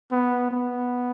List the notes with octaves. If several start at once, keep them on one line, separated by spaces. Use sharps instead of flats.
B3
B3